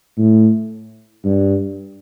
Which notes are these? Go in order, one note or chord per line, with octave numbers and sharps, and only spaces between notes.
A2
G2